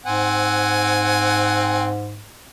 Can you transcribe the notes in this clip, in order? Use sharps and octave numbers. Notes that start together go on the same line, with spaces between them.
G#2 C4 F#5 G#5